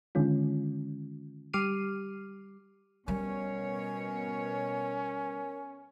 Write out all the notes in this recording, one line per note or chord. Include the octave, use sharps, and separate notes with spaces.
D3 D#3 G#3 C#4 F4
G3 G4 D6 F6 C7 D#7
B2 G3 C#4 A#4 C#5